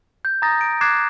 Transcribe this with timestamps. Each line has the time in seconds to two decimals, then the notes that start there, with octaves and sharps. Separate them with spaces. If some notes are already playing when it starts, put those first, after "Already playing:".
0.25 G6
0.42 A#5 D#6 A6 A#6
0.61 D7
0.81 D6 F#6 G#6 A6 C7 E7